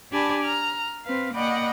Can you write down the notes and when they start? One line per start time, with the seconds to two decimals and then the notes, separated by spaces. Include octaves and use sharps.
0.11 D4 G4 D5 G#5 A5 B5
0.43 A#5 F6
1.04 C4 B4 F5
1.33 A#3 D5 D#5 F#5 G5 B5